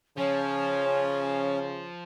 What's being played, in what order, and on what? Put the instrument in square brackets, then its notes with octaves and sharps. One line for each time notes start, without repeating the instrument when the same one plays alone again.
[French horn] C#3 [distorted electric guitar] F3 [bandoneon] C#4 [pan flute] C#5